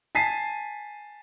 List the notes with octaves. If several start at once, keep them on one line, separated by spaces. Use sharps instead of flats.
G#5 A5 B6 C7 D#7